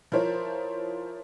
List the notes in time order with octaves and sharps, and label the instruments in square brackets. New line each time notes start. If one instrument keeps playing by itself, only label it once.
[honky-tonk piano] F3 E4 A#4 C5 C#5